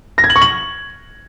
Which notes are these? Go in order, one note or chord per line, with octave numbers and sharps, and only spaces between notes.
A#6
G#6
F#7
C#6
F#7